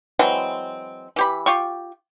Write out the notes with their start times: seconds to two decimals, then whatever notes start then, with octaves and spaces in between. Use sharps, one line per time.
0.19 E3 F#3 G#3 C4
1.16 E3 G4 B5
1.46 F4 G4 C#6